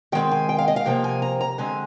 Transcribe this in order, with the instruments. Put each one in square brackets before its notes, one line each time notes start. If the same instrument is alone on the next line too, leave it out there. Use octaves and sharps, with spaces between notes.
[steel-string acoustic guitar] D#3 G#3 C4 G5
G#5
G5
F5
D#5
F5
C3 F3 A#3 G5
G#5
A#5
A#5
D3 G#3 C4 G#5